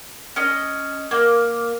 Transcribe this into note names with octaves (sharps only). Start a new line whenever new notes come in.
C#4 D#5
A#3